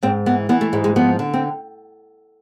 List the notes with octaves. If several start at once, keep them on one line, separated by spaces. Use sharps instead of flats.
G#2 C4
E3 B3
E3 B3
A3
G#2 G#3
G#3
F3 B3
D3
C4